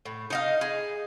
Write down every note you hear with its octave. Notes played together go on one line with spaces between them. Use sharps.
A2
D#4 D#5 F5
G#4